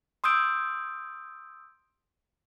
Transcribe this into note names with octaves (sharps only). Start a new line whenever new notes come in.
C6 D#6 E6 G6 D7